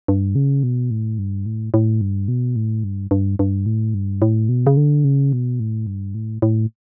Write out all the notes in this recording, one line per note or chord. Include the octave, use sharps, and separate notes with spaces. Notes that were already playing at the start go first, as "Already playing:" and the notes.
G2
C#3
B2
A2
G2
A2
A2
G2
B2
A2
G2
G2
G2
A2
G2
A2
B2
C#3
D3
C#3
B2
A2
G2
A2
A2